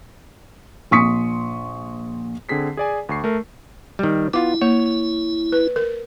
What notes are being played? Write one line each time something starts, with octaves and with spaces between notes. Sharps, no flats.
A#1 C6 C#6 D#6 B6 C#7
D3 C4 G#4 B6 C7
G#4 D5 G#5
D2 C#6 C7
A3 A#4
D#3 G3
B3 E4 F4 D6
A#3 C#5
B4
A#4